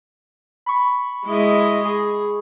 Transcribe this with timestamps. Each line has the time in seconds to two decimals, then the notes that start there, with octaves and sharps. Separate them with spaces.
0.66 B5 C#6
1.26 G#3 E4 D#5
1.84 G#4